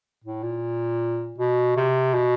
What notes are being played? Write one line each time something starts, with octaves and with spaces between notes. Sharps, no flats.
A2
A#2
B2
C3
B2